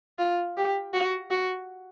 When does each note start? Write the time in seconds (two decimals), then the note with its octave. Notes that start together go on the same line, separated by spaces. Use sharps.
0.19 F4
0.57 G4
0.93 F#4
1.31 F#4